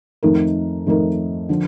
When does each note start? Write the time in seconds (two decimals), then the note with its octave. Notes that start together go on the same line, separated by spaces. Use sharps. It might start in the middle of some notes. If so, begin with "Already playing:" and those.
0.23 F2 D#3 A3 D#4 A#4
0.86 F2 D#3 A3 D#4 A#4
1.49 D3 F3